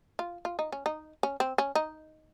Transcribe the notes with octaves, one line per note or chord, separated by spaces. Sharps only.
F4
F4
D#4
C#4
D#4
C#4
C4
C#4
D#4